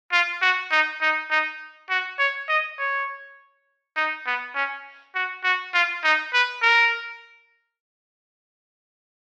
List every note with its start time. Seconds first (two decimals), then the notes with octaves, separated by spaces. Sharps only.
0.12 F4
0.42 F#4
0.71 D#4
1.01 D#4
1.30 D#4
1.90 F#4
2.19 C#5
2.49 D#5
2.79 C#5
3.96 D#4
4.26 B3
4.55 C#4
5.15 F#4
5.44 F#4
5.73 F4
6.04 D#4
6.33 B4
6.62 A#4